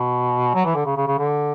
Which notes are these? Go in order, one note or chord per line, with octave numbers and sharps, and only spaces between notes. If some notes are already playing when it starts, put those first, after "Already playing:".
Already playing: B2
F#3
E3
D3
C#3
C#3
C#3
D3